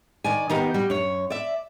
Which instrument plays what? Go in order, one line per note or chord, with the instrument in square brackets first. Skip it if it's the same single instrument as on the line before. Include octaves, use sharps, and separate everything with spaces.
[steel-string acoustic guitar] D#3 D5 G#5
D#3 A#3 B3 D#4 G4
G3 F#4
F#2 C#5
D5 E5